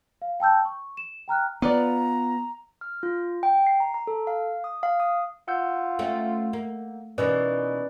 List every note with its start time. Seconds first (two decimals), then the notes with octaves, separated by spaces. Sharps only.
0.22 F5
0.40 G5 A5 E6 G6
0.65 C#6
0.97 E7
1.28 G5 A#5 F6 F#6
1.62 B3 F4 B4 D5 A#5
2.81 F6
3.03 F4
3.43 G5
3.67 C7
3.80 A#5
3.94 A#5
4.07 A4
4.27 F5
4.64 D#6
4.83 F5
5.00 D#6
5.48 F4 F#5 E6 G6
5.99 A3 C4 C#4
6.53 A#3
7.18 B2 E3 A#3 C#4 D#4 B4 D5